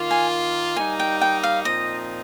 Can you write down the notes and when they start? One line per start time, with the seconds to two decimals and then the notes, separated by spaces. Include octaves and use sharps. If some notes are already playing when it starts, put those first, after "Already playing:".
Already playing: D#3 A#3 F4
0.11 G#5
0.76 G3 A#3 D#4 G#5
1.00 G5
1.21 G5
1.43 F5
1.65 A#2 F3 C4 D#4 D#5